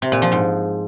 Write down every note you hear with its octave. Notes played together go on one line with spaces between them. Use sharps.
C3
A#2
F3
G#2